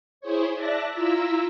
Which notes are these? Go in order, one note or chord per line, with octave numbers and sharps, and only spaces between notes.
E4 G#4 C5 C#5
D5 E5 A5 F#6 A#6
E4 F4 A#5 E6